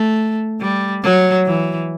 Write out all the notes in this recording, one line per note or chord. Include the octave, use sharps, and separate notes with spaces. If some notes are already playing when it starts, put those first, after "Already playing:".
Already playing: A3
G3
F#3
E3